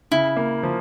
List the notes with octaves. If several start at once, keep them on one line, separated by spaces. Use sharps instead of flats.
C#3 E4
A#3
F3